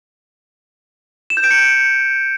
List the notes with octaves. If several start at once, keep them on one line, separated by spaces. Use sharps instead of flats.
E7
G6
D7
C#7